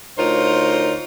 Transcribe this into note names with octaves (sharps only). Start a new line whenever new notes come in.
D2 D#4 F4 A#4 C5 C#5